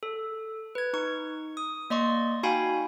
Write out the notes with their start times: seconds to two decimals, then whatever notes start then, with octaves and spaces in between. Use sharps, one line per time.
0.03 A4
0.75 B4 G#6
0.93 D#4 C#6
1.57 D#6
1.90 A#3 D5 D#5 C6 C#6
2.43 D#4 F#4 F5 G5 G#5 B5